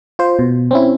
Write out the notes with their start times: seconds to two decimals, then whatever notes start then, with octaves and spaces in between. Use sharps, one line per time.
0.19 F4 C5
0.39 B2
0.71 C4 C#4 E4